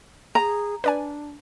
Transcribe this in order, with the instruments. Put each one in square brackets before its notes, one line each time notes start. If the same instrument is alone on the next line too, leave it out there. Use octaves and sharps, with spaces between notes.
[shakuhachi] G#4 [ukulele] A#5
[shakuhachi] D4 [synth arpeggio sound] B4 D5 G#5